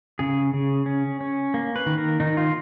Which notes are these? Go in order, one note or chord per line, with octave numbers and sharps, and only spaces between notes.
C#3 G#4
C#3
C#4
C#4
A#3
B4
D#3
A#4
D#3 D#4
F4